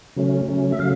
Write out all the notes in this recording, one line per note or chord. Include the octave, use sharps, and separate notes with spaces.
C#3 F#3 A3 C#4
C#3 F#3 A3 C#4
E5
C#3 F#3 A3 F5